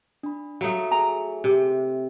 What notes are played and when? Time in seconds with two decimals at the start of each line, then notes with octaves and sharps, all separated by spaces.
0.23 D4 B5
0.61 F#3 A3 F5 A#5 D#6
0.91 G#4 G#5 A#5
1.44 C3